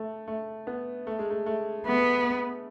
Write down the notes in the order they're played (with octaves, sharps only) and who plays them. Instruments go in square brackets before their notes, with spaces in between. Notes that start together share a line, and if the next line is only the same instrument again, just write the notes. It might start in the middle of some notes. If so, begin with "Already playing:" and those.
Already playing: [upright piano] A3
A3
B3
A3
G#3
A3
A3
[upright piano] A3 [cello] B3